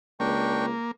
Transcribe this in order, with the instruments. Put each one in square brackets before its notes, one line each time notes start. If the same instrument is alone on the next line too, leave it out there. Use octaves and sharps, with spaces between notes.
[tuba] C#2 [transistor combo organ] A#3 [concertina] D4 G5 C#6